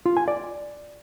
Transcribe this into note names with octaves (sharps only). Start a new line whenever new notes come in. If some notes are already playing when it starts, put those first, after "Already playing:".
F4
G#5
D5